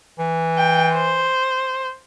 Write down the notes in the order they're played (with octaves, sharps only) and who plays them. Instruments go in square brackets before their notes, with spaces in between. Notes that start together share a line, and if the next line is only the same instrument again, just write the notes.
[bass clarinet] E3
[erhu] G5
C5